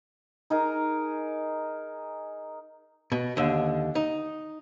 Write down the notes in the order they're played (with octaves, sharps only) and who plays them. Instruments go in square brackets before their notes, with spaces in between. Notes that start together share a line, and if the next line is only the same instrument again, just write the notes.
[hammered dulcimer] D#4 G#4 A#4
[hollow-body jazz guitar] B2
D#2 D3
D#4